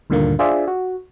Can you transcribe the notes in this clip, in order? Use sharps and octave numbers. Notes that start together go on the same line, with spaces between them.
D2 G2 A#2 D3 D#3 A#3
D4 F4 G#4 C5 D5 E5
F#4